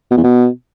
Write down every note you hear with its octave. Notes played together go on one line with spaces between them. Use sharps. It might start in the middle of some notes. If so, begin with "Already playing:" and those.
B2
E2
B2